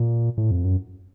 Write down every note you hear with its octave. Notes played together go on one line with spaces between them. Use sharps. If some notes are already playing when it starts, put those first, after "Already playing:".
Already playing: A#2
A2
F2
F#2